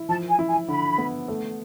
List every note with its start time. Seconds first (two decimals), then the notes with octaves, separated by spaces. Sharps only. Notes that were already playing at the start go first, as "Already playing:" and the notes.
Already playing: E4
0.09 F3 A5
0.28 G#5
0.39 E4
0.48 G#5
0.68 D3 B5
0.98 B3
1.28 A3